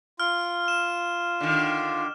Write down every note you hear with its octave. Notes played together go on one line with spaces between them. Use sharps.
F4 F6
E7
D3 D#3